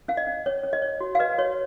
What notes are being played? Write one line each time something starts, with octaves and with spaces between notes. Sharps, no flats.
C#4 F5
D#5
C#4
C#4 C#5
C#4
D#5
C#5
F#4
F5
B4 D#5
F#4 C#5